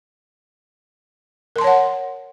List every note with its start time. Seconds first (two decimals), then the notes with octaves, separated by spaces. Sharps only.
1.56 A#4
1.58 C6
1.61 A5
1.64 C#5
1.67 F#5